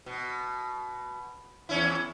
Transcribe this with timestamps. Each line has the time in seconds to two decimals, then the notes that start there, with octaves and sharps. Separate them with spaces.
0.06 B2
1.69 E2 C#4 E4